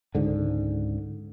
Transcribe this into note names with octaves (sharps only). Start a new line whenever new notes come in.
C#2 G#2 D3